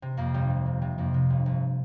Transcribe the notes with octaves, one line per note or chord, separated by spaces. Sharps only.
C3
F2 A#3
G1 G3
C3
C3
C3
F2 A#3
C3
G1
G1